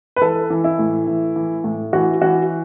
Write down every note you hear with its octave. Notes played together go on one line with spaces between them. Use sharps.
B4
E3 A4
E3
E4
A2
E3
E3
A2
E3 F#4
E3 F#4